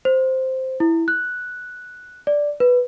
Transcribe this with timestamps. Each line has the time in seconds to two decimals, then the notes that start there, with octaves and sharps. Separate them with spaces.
0.05 C5
0.80 E4
1.08 F#6
2.27 D5
2.60 B4